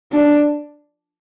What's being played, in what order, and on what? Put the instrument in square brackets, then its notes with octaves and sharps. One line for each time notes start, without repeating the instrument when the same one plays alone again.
[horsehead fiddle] D4